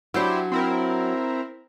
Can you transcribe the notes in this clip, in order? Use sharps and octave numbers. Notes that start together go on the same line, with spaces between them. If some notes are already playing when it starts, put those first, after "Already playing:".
F#3 D4 E4 G4 C5
C4 E4 A#4